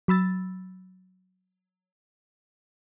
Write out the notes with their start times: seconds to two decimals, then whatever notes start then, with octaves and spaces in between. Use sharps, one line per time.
0.08 F#3 B5 E6 A6